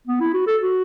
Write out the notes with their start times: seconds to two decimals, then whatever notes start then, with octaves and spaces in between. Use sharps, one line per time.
0.07 B3
0.20 E4
0.34 F#4
0.47 A4
0.61 F#4